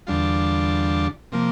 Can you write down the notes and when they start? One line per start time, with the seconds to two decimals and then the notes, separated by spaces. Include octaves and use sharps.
0.07 E2 D3 G3 D4 F4
1.32 C3 F3 A#3